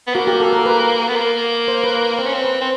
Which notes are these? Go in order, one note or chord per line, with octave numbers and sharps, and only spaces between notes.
B3
A#3 F#4
G4
A4
A#4
B4
B3
A#3
C5
B4
C4 C5
C#4
C4
B4
C4